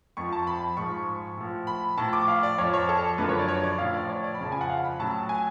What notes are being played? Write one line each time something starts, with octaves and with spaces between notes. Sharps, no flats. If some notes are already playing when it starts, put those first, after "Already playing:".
F2 F3 C#6
A5
B5
G#2 F3 C#6
A2 F3
B5
A2 F3 A5
D6
F5
D5
F2 F3 C#5
C#5
A4
F#2 D3 F3 B4
C#5
D5
C#5
D5
A2 F3 F5
D5
C#5
D5
B5
F2 C#3 F3 A5
G#5
F#5
F5
B5
A2 F#3 A5
G#5